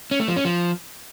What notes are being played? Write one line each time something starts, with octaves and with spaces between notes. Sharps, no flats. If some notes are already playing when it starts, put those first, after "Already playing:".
C#4
A3
F3
C#4
F3